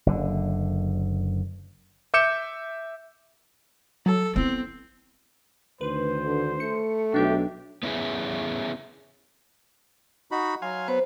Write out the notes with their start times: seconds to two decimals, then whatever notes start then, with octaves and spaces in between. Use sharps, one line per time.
0.06 F#1 D3
2.14 E5 D6 G6 C#7 E7
4.06 F#3 A4
4.36 B3 C4 E4
5.81 D2 D#3 B4 C5
6.25 D3
6.60 A3 C#7
7.14 B1 D4 G4 E5
7.83 B3 C#4 E4 G4 G#4
10.31 D#4 F#4 B5
10.62 F#3 F5 G#5 C6
10.88 B3 C5